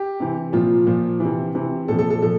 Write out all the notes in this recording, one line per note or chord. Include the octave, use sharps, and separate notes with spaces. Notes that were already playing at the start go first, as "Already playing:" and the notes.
Already playing: G4
C3 E3
A#2 F3 F4
A#2 F3
C3 E3
C3 E3
A#2 F3 A4
A4
A4
A#2 F3 A4